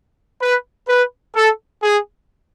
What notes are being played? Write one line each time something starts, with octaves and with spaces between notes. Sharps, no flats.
B4
B4
A4
G#4